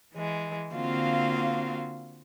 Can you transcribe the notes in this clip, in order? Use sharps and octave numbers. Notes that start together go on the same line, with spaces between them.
E3 G#3
D3 A#3 C4 F4 F#4 F5